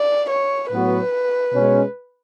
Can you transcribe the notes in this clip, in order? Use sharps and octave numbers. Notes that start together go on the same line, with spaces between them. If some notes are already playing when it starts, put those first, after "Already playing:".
Already playing: D5
C#5
A2 F#3 B3 F#4 B4
B2 G#3 C#4